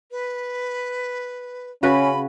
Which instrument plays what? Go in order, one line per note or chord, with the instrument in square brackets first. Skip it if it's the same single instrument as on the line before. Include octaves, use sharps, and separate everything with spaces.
[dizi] B4
[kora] C#3 F#4 B4 [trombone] C#4 [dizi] B5